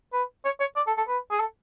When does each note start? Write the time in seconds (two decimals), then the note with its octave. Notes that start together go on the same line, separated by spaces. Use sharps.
0.13 B4
0.45 C#5
0.60 C#5
0.76 D5
0.87 A4
0.97 A4
1.08 B4
1.31 G#4
1.40 A4